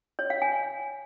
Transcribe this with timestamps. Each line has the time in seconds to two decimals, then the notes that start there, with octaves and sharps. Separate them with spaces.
0.19 C#5
0.30 F5
0.42 G#5